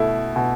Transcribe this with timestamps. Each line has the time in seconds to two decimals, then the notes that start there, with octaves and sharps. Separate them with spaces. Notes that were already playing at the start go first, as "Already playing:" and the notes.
Already playing: B2 A3 E4
0.36 B2